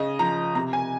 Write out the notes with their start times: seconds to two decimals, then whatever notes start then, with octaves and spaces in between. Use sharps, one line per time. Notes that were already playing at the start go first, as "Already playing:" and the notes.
Already playing: C#3 D#5
0.19 F3 A#5
0.55 C3 A#5
0.73 G#5